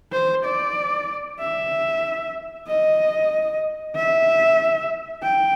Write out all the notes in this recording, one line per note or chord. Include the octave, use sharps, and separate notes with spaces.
C5
D5
E5
D#5
E5
G5